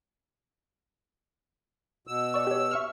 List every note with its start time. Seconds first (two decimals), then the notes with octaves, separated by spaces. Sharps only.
2.07 B2 E6
2.34 D5 C#6
2.47 G4 C#5
2.71 E5 C#6 F6